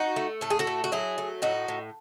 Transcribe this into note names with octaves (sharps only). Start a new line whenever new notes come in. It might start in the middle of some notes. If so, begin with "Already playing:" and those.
Already playing: D#4 F#4
A3
A2 A4
G#4
F#4 A4
A3
F#4
F#3 E4 G#4
A3
A2 D#4 F#4
A2